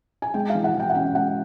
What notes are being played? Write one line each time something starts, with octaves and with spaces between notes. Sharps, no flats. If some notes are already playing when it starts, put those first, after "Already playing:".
G#5
G#3 G5
F5
E3
F#5
E3
G5
F#5
C#4 G5
G#3 F#5